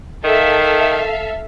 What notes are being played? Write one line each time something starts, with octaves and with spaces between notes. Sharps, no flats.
D#3 A4 E5 F5